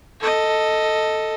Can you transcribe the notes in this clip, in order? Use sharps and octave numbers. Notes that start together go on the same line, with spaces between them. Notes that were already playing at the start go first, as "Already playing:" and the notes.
A4 D#5